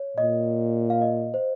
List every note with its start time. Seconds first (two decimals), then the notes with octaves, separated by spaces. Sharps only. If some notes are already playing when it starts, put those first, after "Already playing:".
Already playing: C#5
0.17 A#2 D#5
0.90 F5
1.02 D#5
1.34 C5